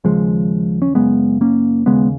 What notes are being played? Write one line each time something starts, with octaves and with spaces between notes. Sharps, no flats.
D#2 C#3 F3 G#3
C#4
F#2 C#3 G#3 B3
A#3 C#4
D#2 C#3 G#3 B3